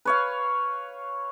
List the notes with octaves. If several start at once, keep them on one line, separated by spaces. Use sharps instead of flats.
B4 C#5 F5